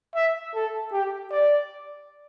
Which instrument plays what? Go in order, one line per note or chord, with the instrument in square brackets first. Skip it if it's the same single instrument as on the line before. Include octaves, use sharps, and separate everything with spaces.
[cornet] E5
A4
G4
D5